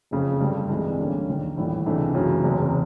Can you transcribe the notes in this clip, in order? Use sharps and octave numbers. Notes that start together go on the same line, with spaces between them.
F#1 F2 C#3
G2 D3 G3
C2 C3 E3 G#3
D3 G3 A#3 C#4
E1 D#2 D3
A#1 A2 E3 G3
C#2 C3 E3 A3 D4
F#2 C#3 E3
F#1 E2 C3